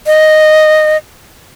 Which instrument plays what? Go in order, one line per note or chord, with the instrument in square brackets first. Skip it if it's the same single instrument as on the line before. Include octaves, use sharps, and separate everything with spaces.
[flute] D#5